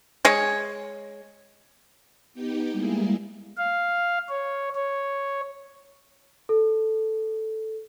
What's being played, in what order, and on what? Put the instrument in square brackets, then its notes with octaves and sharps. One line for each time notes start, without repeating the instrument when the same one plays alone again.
[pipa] G#3 C#5
[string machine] B3 D#4 G4 G5
G3 G#3 A#3 E4 G#4
[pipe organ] F5
C#5
C#5
[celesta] A4